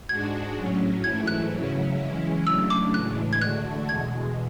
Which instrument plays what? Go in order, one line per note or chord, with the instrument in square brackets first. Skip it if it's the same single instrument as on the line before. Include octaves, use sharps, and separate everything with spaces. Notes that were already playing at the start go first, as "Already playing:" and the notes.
[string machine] G#2 G#3 D4 F#4 [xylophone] G#6
[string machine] A2 F#3 C#4
[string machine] G#2 E3 A3 E4 [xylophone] G#6
[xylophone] F#6
[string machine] C#3 F#3 C#4 E4
E3 G#3 C#4 E4
[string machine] C#3 F#3 A3 D4 [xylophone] E6
[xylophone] D6
[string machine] A2 E3 G#3 D4 [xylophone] F#6
[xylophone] G#6
[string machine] D3 A3 D4 F#4 [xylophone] F#6
[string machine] E2 B2 G#3 [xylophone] G#6